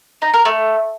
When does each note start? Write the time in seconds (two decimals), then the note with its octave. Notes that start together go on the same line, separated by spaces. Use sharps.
0.22 D#4
0.34 A#4
0.45 A3